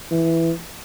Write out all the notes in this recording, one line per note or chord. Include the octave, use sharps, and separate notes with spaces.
E3